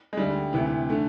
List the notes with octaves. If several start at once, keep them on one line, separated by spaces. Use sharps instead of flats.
G#3
D2 D3 G3
D2 C3 E3
D3 A3